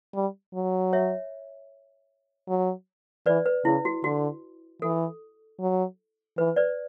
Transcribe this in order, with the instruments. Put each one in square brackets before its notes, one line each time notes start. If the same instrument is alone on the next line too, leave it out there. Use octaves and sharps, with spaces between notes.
[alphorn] G3
F#3
[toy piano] C#5 E5
[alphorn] F#3
[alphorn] E3 [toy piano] B4 D5
[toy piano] B4
[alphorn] C#3 [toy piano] E4
[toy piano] F#4
[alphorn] D3 [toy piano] F#4
[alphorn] E3 [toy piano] A4
[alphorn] F#3
[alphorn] E3 [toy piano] B4
[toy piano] B4 D5